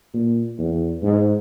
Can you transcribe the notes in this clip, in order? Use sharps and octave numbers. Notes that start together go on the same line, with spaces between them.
A#2
E2
G#2